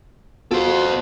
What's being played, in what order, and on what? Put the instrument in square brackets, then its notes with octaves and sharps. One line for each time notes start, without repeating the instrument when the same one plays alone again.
[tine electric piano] B3 F4 F#4 [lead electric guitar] A4 C5